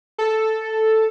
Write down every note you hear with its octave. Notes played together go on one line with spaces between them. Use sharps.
A4